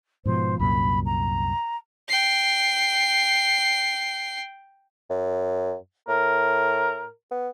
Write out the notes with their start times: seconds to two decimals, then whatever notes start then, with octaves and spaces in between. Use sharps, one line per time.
0.25 G#2 B2 F3 C5
0.59 C2 F#2 A#2 B5
1.06 A#5
2.08 G5 C7
5.10 F#2
6.08 A2 A#4
7.31 B3